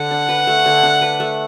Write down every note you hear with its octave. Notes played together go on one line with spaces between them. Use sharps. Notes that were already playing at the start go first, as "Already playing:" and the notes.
Already playing: D3 F#5
D4
B4
A3
D3
D4
B4
A3